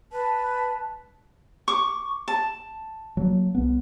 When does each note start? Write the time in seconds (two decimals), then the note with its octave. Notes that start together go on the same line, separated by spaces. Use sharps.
0.12 B4 A5
1.68 C#6 D6
2.28 A5
3.17 F#3 A#3
3.55 C2 B3